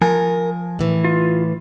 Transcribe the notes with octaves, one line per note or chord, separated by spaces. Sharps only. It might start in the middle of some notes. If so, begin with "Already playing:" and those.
F3 A#4 G#5
A2 E3
F4